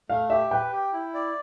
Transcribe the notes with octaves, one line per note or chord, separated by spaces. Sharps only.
A3 F5
G4 E5
B4 G5
G4
E4
D5